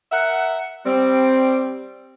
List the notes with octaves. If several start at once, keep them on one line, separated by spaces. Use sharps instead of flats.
A#4 E5 F#5
G3 C4